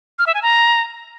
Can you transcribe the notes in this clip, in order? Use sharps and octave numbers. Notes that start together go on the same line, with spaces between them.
F6
E5
G#5
A#5